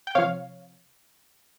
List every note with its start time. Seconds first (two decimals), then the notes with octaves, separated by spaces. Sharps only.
0.07 G5
0.15 C3 F3 C#5 F5